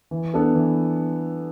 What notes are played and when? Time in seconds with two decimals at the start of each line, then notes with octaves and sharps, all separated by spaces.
0.11 E3
0.34 B3 D4 A4
0.55 E3